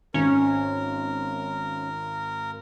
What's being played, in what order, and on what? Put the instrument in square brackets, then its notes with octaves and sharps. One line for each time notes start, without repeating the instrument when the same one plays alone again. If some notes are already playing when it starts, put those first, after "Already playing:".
[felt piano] G#1 [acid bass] C#4 [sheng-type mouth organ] A#4